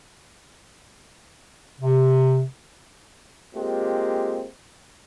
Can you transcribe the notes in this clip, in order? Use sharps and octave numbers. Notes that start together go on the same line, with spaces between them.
C3
G#3 A#3 C4 F4 G4